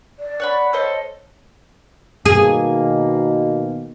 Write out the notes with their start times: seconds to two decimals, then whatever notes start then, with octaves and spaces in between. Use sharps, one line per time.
0.19 D5
0.40 C#5 F#5 B5
0.73 A4 C5 C#5 D#5
2.25 B2 D#3 A#3 G#4